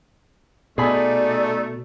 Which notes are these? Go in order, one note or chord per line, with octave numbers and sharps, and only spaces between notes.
B2 A3 D#4 G#4 D5 B5